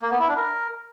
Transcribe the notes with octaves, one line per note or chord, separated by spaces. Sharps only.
A#3
B3
E4
D4
A#4